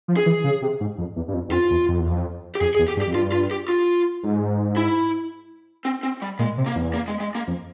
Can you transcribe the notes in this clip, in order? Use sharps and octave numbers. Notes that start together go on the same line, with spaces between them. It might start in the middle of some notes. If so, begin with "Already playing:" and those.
F3
G#4
E3
C#3
C3
G#2
F2
E2
G2
F2
E2
F2 F4
E2
F2
E2
F2
G4
F2 G#4
G#4
E2
G4
G2
G4
F2
G2 F4
F4
G4
F4
G#2
E4
C4
C4
G3
A#2 G#3
C3
A#3
E2
A#3
G#3
G#3
A#3
F2